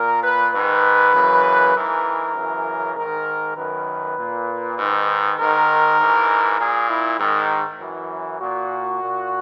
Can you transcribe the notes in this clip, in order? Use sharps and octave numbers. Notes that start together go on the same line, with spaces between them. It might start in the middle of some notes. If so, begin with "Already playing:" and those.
Already playing: A#2 A#4
B4
G#2 D#3 B4
F#2 C#3 E3
G#2 E3 A#4
F#2 C#3 E3
G#2 D#3 A#4
F#2 D#3 B4
A#2
G#2 D#3
G#2 D#3 A#4
G#2 E3
A#2 G#4
E4
G#2 D#3
F#2 E3
A#2 F#4
A#2